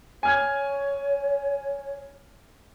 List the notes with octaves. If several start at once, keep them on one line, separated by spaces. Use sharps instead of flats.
C#5 G#5 F6 G#6